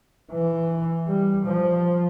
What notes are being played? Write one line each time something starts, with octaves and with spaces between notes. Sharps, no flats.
E3
G3
F3